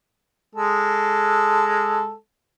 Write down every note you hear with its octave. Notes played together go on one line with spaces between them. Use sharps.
G#3 A4